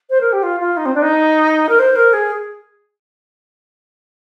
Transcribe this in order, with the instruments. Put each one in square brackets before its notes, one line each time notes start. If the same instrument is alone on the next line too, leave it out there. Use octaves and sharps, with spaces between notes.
[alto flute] C5
A#4
G4
F4
F4
D#4
C4
D4
D#4
A#4
C5
A#4
G#4